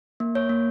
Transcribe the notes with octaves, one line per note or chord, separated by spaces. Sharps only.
A#3
C#5
A#3